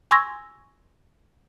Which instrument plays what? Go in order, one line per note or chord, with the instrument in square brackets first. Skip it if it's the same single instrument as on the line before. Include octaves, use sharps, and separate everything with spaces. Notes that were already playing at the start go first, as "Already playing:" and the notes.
[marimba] G#5 C6 C#6 E6 G#6 A#6